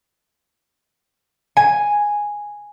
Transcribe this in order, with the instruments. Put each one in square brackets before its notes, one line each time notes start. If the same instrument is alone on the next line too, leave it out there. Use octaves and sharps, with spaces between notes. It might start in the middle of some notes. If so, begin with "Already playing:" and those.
[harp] G#5